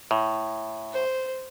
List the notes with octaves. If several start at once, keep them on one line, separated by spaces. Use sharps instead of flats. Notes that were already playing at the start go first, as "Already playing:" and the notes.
A2
C5